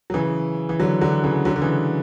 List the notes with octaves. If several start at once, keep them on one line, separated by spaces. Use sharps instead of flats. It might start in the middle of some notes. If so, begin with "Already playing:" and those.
F#3
C#3 E3
E3
D3 F#3
D3 F#3
C#3 E3
D3 F#3
D3
C#3 E3